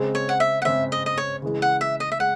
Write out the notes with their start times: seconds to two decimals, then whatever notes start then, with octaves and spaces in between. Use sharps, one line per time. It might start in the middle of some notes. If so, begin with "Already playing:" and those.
Already playing: C#3 G#3 C4
0.15 C#5
0.29 F#5
0.40 E5
0.62 F#5
0.65 C#3 G#3 C4 E5
0.92 D#5
1.06 D#5
1.18 C#5
1.42 C#3 E3 G#3
1.62 F#5
1.81 E5
2.00 D#5
2.12 E5
2.19 G#3 F#5